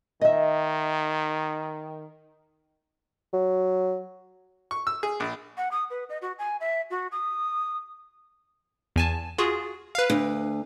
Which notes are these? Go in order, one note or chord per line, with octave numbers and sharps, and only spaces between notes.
D#3 D#5 E5
F#3
C#6
E6
G#4
A#1
F#5
D#6
B4
D#5
F#4
G#5
E5
F#4
D#6
E2 G#5 A5
F4 F#4 G#4
B4 F5
D2